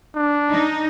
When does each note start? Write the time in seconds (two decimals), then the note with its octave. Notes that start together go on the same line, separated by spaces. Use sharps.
0.15 D4
0.51 D#4